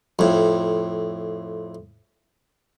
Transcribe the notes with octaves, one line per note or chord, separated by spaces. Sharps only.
F2 A2